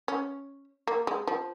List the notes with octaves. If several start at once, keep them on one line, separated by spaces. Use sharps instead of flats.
C#4
A#3
G#3
F3